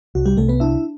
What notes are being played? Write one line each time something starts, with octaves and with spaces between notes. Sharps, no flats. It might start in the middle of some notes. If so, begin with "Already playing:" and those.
C2 F#4
G3 G4
C2 A3 A4
B3 B4
D4 E4 E5